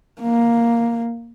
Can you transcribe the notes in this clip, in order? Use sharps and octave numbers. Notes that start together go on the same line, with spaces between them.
A#3